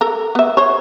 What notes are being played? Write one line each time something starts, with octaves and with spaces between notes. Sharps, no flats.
A4 A#4 A#5
B3 E5
C5 C#5